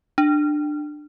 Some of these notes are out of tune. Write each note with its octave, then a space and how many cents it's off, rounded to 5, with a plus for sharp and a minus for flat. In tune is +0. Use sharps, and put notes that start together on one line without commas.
D4 +20